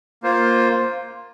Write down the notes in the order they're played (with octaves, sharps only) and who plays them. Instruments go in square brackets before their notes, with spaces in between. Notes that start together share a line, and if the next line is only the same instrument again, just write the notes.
[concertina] A#3 F4 C5